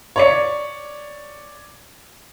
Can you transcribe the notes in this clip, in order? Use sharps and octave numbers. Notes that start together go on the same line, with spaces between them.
C#5 D5 C#7